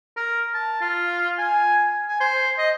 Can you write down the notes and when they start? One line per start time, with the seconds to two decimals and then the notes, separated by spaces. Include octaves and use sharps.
0.17 A#4
0.54 A5
0.81 F4
1.39 G#5
2.08 G#5
2.20 C5
2.58 D#5